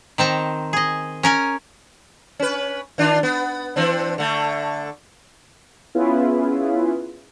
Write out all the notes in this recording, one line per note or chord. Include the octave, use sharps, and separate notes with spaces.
D#3 C4 A5 A#5
G#4 D#5
C#4 A#4 G#5
C#4 B4
D#3 D4 F4
B3
E3 C4 D4
D3 A3
B3 C#4 E4 F4 G#4 B4